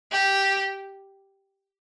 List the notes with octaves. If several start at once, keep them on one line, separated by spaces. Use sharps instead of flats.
G4